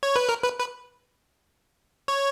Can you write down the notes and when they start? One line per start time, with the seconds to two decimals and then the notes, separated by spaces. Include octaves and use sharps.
0.03 C#5
0.16 B4
0.29 A#4
0.43 B4
0.59 B4
2.08 C#5